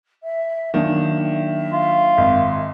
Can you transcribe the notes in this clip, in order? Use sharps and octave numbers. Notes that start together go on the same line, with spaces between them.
E5
D#3 F#3 A#3 D4 E5
F4
G#1